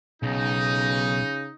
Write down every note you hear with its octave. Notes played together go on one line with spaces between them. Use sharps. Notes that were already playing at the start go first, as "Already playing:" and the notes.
B1 C#3 D#4